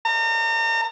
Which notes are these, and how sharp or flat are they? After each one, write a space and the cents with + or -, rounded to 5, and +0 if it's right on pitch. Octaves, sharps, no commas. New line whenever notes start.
A#5 -40